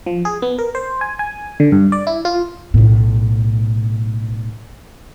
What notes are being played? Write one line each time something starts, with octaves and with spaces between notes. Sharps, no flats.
F3
G#4
B3
A#4
C5
G#5
G#5
D3
G2
D5
E4
F4
B1 A2